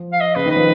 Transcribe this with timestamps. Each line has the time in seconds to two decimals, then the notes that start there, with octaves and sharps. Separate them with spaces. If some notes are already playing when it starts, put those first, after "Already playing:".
Already playing: F3
0.13 F5
0.21 D#5
0.35 C#3 B4
0.46 D#3
0.50 B4
0.56 F3